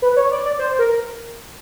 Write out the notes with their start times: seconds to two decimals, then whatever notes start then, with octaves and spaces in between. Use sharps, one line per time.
0.02 B4
0.16 C#5
0.31 D5
0.45 D5
0.59 C5
0.79 A#4